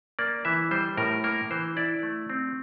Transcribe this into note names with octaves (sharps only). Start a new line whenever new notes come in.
A#3 D5
E3 E5
G3 C5
A2 A#4
A#3 A#4
E3 C5
E4 D5
A3
C4